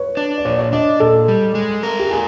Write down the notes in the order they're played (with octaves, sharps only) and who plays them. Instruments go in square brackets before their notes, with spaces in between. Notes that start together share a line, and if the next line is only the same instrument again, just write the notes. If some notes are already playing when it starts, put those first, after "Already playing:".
Already playing: [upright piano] B4 C#5
[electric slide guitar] D4
[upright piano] D5
[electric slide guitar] A#2 [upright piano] C#5
[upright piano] C#5
[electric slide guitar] D4 [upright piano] D#5
[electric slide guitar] A#2 [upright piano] A4
[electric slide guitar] G3
G#3
A#4
[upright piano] G4
[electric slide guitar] F4 [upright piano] G#4